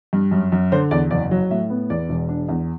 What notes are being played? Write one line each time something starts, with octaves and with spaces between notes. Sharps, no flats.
G2
F#2
F#2
D3 C5
E2 D5
F#1 D5
F#3
A2 E5
B3
E2 D5
E1
D4
E2